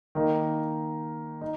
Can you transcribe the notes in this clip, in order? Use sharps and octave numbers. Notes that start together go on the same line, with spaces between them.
D#3 A#3 D#4
D#4